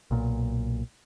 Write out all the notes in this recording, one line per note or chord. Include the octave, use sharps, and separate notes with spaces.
B1 A#2